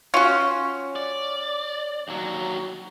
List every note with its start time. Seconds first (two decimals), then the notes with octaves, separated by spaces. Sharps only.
0.14 C#4 F4 F#4
0.96 D5
2.08 D#2 F#3